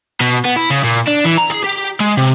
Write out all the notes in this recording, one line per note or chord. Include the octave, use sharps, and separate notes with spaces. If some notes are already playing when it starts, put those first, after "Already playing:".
B2
B3
E4
C#3
A#2
D4
E3
A#5
G#4
G4
G#3
C3